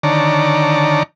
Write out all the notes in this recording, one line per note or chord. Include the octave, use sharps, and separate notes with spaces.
D3 D#3 C#5 D5 A5 A#5